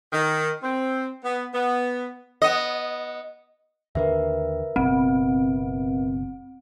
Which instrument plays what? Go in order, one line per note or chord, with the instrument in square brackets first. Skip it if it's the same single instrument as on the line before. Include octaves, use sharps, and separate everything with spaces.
[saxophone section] D#3
C4
B3
B3
[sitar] B3 D#5
[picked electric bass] D#2 D3 [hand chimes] A#4 B4 E5
[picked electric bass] F#1 B2 [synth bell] C4